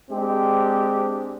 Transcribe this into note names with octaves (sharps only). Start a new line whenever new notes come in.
G#3 C4 D4 G4